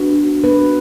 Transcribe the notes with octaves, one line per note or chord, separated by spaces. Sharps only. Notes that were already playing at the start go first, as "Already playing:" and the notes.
Already playing: B3 D4 F#4 B4
B3 D4 F#4 B4